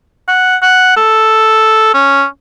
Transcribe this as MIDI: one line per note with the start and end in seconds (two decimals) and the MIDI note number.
0.28 0.56 78
0.62 0.96 78
0.97 1.91 69
1.94 2.24 61